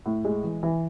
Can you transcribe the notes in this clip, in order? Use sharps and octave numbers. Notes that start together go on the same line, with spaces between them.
A2
G#3
E3
E3